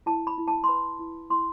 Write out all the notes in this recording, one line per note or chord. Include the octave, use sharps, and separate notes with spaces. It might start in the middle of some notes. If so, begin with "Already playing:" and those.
E4 A5
B5
E4
A5
C6
B4 B5
E4
E4 C6